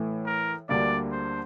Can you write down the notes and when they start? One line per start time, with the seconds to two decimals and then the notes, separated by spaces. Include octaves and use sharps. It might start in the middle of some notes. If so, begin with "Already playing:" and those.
Already playing: A2 E3 A3
0.26 A#4
0.69 D2 D3 G3 A#3 D4 D5
1.12 C5